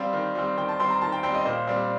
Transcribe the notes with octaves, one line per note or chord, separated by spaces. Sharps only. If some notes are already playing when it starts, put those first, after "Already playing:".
Already playing: G3 C4 F5
D#3
G3 C4
D#3 G5
A5
G3 C4 C6
A#5
D#3 A5
G5
G3 C4 G5
D#5
A#2 C5
G3 C4